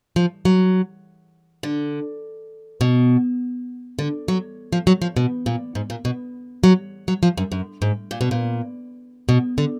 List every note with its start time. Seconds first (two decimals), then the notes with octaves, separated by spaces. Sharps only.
0.16 F3
0.45 F#3
1.63 D3
2.81 B2
3.99 D3
4.28 F#3
4.73 F3
4.87 F#3
5.02 F3
5.16 B2
5.46 A#2
5.75 G#2
5.90 A#2
6.05 B2
6.64 F#3
7.08 F#3
7.23 F3
7.38 F#2
7.52 F#2
7.82 G#2
8.11 A#2
8.21 B2
8.31 A#2
9.29 B2
9.58 D3